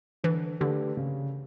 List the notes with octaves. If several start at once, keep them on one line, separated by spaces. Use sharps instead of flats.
D3 E3
D3 A3 D4 G4 B4
C#3